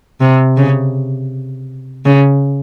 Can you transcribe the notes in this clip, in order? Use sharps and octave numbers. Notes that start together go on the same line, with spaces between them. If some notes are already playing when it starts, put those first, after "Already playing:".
C3
C#3
C#3